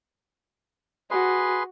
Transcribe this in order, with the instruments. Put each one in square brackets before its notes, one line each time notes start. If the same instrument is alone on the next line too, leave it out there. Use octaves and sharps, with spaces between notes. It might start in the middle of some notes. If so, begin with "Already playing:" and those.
[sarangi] F#4 [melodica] G#4 B4 C6